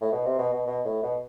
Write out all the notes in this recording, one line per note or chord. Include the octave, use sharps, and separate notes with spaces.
A2
B2
C3
B2
B2
B2
A2
B2